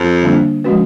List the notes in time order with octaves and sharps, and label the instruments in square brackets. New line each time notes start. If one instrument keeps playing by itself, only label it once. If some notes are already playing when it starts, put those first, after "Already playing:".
Already playing: [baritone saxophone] F2
[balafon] D3 G3 A#3 D4
F3 G#3 C#4 F#4 B4